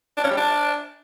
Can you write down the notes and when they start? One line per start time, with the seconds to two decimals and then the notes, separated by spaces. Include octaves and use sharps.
0.17 D4
0.24 C#4
0.30 G3
0.37 D4